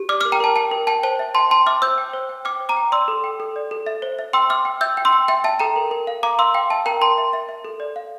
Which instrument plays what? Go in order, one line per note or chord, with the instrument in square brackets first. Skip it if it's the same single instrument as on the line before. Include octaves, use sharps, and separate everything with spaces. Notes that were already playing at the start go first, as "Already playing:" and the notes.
Already playing: [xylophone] G4
D5 D6 F6
A#4 D6 F6
G5 A#5
A#4 A5
G5 A5
A#4
G5 A5
C5 A5
E5
G5 A5 C6
G5 A5 C6
E5 D6 F6
C5 E6 G6
G5
C5
G5
G5 D6 F6
C5
A#5 D6
G5
D5 C6 E6
A4
G5
A4
D5
A4
E5
C5
E5
G5 C6 E6
E5 D6 F6
G5
E5 E6 G6
G5
C6 E6
G5
E5 G5
E5 A5
A4 G5 A#5
A#4
A#4
F5
F5 A#5 D6
F5 C6 E6
F5 G5
E5 A5
A#4 G5 A#5
A#4 A5 C6
E5
E5
E5
A4
D5
F5